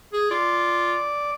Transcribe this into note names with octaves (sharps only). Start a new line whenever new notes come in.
G#4
F4 D5